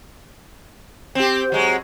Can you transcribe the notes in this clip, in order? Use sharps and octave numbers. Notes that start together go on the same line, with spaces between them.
C4 G4
F#3 G#3